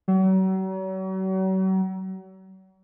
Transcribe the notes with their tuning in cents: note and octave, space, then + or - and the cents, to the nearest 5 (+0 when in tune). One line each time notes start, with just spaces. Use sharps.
F#3 +40